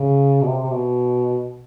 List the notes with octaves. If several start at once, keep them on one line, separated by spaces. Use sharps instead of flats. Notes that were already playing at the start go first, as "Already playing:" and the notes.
Already playing: C#3
B2
C3
C3
B2